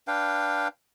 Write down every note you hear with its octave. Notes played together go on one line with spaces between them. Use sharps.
D4 B4 F5 G5